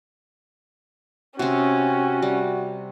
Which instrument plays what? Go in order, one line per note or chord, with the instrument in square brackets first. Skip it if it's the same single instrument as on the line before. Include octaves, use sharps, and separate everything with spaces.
[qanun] C3 C4 [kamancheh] C#4 [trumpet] F#4
[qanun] G3